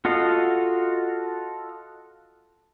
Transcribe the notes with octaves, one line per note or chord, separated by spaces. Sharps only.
F4 F#4 A4 D#5 F5